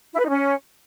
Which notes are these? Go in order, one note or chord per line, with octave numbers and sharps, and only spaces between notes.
E4
B4
D#4
C#4